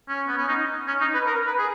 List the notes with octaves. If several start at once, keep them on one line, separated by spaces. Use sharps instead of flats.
C#4
B3
C#4
D#4
C#4
D#4
B4
A#4
B4
G#4